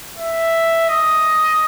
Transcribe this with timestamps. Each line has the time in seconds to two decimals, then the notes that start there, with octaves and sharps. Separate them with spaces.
0.17 E5
0.89 D#5